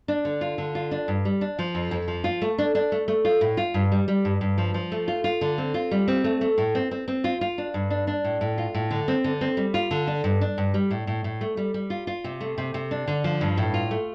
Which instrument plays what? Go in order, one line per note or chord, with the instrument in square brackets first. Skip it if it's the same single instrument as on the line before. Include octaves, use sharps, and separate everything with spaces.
[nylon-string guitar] D4
D3
F4
D3
F4
D4
G2
G3
D4
F3
F2
F2
F3
F4
A3
D4
D4
A3
A3
F4
A2
F4
G2
G3
G3
G2
G2
F3
F3
A3
F4
F4
D3
C4
F4
G3
C4
A3
A3
A2
C4
C4
C4
F4
F4
D4
G2
D4
D4
A2
A2
F4
A2
D3
C4
D3
C4
G3
F4
D3
D4
G2
D4
G2
G3
A2
A2
A2
A3
G3
G3
F4
F4
C3
A3
C3
C3
D4
D3
F3
G2
A2
F4
A3